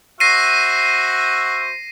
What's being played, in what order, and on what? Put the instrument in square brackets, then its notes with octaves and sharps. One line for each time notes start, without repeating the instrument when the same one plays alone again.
[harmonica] F#4 C5 E5 [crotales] A#6 C7 D#7